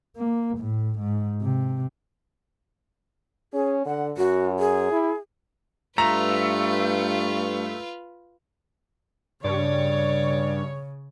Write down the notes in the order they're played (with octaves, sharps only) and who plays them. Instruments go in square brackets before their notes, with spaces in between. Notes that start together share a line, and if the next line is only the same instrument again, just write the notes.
[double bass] A#3
A2
G#2
C3
[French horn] C#4 [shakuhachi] G#4
[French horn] D3 [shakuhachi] F#5
[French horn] F#2 [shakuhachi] F#4
[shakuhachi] G#4
[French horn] E4
[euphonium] G2 [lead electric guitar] A3 [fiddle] F4 B4 [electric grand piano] A#5
[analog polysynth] G2 [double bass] C#3 [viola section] C#5 [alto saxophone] D5